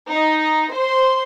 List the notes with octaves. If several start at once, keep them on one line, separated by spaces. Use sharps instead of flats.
D#4
C5 C6